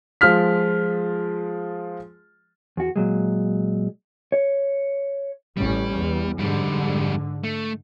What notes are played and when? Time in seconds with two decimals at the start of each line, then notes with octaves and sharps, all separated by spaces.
0.21 F3 G#3 F4 F6 B6
2.77 E2 F#4
2.96 A#2 F#3 G#3
4.32 C#5
5.57 A1 G3 C#4
5.98 E2
6.38 F2 G#2 D3 G3
7.44 A3